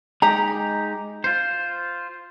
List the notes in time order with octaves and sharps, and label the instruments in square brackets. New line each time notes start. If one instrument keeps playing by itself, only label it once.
[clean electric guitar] G#3 D#4 G4 [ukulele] A#5
[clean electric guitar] F4 C5